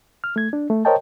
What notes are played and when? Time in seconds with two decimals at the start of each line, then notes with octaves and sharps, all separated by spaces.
0.24 F6
0.36 A3 G#6
0.53 D4
0.70 A3
0.85 A#4 C5 C#5 D#5 G5 A5